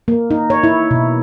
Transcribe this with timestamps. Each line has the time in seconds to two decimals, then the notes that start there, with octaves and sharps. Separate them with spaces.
0.08 A#3
0.31 D#4
0.50 C#5
0.64 E4
0.91 B2